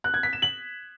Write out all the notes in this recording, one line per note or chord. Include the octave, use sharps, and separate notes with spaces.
F#6
G#6
B6
E7
F#7